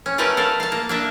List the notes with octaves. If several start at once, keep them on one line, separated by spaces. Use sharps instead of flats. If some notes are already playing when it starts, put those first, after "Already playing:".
C#4
A3 C#4 F#4 A#4 B4 D5
A4 A#4 D5 F5
F5 A5
A#3
A#3 D4 E5